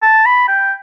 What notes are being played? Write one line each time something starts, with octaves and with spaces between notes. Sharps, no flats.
A5
B5
G5